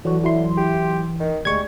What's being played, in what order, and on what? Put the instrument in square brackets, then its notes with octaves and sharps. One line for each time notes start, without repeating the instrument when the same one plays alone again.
[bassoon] D3 [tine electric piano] E3 [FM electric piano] F#3 F#4
[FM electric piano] F#3 E4 C6
[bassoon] G4
D#3
[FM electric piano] D2 G#3 [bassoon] G3 [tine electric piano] C#6 G#6